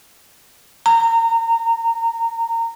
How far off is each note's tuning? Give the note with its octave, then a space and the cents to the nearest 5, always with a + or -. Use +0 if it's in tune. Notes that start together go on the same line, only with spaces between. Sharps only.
A#5 -20